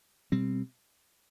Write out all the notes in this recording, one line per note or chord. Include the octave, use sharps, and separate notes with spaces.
B2 G3 C4